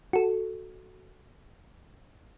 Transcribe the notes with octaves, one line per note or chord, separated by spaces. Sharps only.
F#4 A4